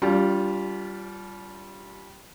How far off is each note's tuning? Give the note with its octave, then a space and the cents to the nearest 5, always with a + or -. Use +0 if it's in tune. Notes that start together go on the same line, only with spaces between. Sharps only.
G3 -10 D4 -40 F4 +0